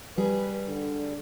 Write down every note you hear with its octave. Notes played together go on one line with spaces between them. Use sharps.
G3 G#4 B4
D3